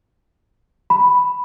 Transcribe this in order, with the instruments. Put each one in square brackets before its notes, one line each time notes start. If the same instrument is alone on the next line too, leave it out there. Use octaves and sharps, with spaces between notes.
[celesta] B5